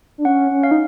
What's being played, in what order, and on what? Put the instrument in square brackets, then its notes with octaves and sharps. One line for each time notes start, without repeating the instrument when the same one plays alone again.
[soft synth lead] D4
[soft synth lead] C#4 [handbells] F#5
[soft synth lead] C#4
[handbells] F5
[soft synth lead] D#4